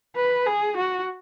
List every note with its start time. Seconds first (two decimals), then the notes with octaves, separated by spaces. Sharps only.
0.16 B4
0.46 G#4
0.77 F#4